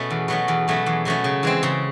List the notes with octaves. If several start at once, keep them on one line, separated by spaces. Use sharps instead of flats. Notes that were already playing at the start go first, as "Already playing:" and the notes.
Already playing: B2 A3 C#4
E2
B2 F#3 A3 C#4
E2
B2 F#3 A3 C#4
E2
B2 F#3 A3 C#4
C#3
E3 G#3 C4
C#3